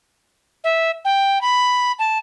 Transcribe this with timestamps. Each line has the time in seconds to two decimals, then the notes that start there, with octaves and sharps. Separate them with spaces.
0.63 E5
1.04 G5
1.41 B5
1.98 A5